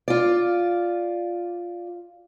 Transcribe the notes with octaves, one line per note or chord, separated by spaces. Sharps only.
F4 D5